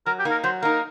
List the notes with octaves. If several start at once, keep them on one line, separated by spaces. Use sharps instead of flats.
F#3 A#4
G4
A#3 D#4
A#4
F#3 C5
A#3 D#4 A#4